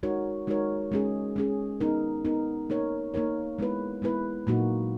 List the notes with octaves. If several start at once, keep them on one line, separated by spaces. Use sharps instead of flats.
G#3 D#4 F#4 A#4 C#5
G#3 D#4 F#4 A#4 C#5
G#3 C#4 G#4
G#3 C#4 G#4
B3 D#4 A#4
B3 D#4 A#4
A#3 D#4 A#4 C#5
A#3 D#4 A#4 C#5
G#3 B3 E4 B4
G#3 B3 E4 B4
A#2 F#3 A#3 D#4 F#4